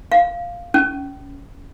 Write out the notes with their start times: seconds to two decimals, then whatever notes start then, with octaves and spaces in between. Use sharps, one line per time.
0.12 F5
0.74 C#4